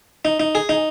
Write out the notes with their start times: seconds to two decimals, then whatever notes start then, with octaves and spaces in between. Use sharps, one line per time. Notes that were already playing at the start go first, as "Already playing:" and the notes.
0.25 D#4
0.40 D#4
0.55 G#4
0.69 D#4